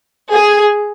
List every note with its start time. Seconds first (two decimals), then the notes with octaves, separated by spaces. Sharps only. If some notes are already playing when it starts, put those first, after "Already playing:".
0.30 G#4